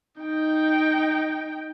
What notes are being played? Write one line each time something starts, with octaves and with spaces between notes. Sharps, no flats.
D#4 G5